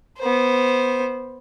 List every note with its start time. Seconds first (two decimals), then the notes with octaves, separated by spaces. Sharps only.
0.19 B3 C5